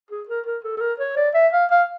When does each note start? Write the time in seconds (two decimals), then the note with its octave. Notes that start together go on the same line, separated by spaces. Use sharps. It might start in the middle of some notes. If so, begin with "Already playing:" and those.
0.11 G#4
0.29 A#4
0.46 A#4
0.64 A4
0.77 A4
0.81 A#4
1.00 C#5
1.17 D5
1.35 E5
1.53 F5
1.71 F5